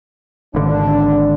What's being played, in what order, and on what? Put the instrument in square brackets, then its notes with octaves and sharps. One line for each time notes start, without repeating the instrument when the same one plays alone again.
[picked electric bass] G#1 D3 [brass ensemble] D4